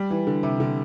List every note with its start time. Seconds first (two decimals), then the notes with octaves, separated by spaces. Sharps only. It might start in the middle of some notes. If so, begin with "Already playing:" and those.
Already playing: G3
0.10 E3
0.27 D3
0.43 C3
0.60 D3